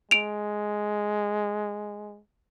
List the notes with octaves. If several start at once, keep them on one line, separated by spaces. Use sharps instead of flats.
G#3 D7 F7